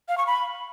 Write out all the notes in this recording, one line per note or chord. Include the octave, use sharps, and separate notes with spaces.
F5
C#6
B5